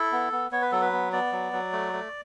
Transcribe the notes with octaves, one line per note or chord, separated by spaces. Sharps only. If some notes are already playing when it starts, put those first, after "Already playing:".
Already playing: E4 A4
B3
B3
B3 C#5
B4
F#3 A4
B4
B3
B3 D5
F#3
F#3
A3
A3